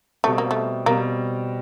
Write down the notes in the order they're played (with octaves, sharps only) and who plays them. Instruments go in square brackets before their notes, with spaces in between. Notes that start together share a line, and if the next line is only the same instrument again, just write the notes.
[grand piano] B2 G3 C4 [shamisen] A3
[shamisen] A#3
A3
[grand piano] B2 G3 C4 [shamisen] A#3